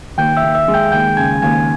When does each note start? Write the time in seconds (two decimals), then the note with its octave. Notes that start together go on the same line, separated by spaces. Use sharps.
0.18 D#2 G5 G6
0.37 E5 E6
0.43 D#2
0.55 E5 E6
0.68 G#3
0.74 G5 G6
0.92 D#2 G5 G6
1.17 C#3 G#5 G#6
1.42 D#2 G#5 G#6